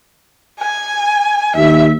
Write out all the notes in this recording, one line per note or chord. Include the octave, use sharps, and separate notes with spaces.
G#5
D#2 E5